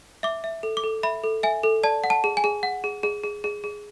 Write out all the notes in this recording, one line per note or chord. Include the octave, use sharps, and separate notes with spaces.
E5 D6
E5
A4
D6
A4
E5 B5
A4
E5 G#5
A4
D5 A5
F#5
A5
G#4
G#5
G#4
F#5
G#4
G#4
G#4
G#4
G#4